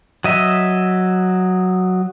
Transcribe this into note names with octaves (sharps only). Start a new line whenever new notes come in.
F#3 D#5 E5